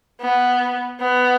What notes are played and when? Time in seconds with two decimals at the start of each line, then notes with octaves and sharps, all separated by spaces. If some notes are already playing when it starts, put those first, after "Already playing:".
0.21 B3
1.00 B3